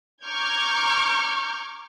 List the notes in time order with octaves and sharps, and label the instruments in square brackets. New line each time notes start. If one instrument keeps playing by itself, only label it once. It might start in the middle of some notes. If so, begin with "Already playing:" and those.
[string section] A#5 C#6 D6 F6 G6 G#6